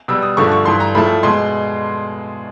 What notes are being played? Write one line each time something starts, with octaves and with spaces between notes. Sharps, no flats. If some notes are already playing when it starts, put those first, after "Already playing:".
B2 G3 E6
D#6
G2 D3 F3 A3 C#6
C#6
G2 E3 A3 C6
A#5
A2 F3 A3 B5
B2 G#3 C6